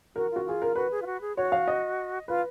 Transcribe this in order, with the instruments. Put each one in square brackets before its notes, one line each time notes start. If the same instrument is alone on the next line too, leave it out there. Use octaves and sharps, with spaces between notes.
[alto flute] F#4 [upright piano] A#4
[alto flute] F4
[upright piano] F#4
[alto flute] F4 [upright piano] G#4
[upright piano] A#4
[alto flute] F#4 [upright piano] B4
[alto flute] G#4
F4
F#4
G#4
[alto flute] F#4 [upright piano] C#5
[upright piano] F5
D#5
[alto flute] F4 [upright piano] B4